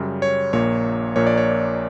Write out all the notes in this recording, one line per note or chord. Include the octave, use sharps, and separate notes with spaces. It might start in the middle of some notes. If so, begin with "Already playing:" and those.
Already playing: F#2 C#3 G3
C#5
A#1 A#2 A#3 C#5
A#1 A#2 A#3 C#5
D5
C#5